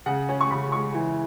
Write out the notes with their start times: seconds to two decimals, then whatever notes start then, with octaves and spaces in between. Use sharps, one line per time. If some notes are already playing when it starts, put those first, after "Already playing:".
0.06 C#3 F#5
0.29 C#4
0.41 C#6
0.51 C#3 B5
0.72 G#3 C#6
0.94 E3